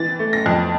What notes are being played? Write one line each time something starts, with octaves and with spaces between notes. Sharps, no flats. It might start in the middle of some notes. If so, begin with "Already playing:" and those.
Already playing: E3 A6
A3
A#6
F2